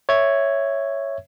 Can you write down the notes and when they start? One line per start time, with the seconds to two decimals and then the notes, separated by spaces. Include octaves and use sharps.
0.09 C#5 E5 G#6